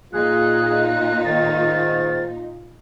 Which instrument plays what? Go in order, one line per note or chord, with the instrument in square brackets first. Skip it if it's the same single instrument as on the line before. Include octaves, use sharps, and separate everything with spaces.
[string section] A#2 D#4 [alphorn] F4 [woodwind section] G#4 [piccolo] F#6
[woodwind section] G#2 D#3 [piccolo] A6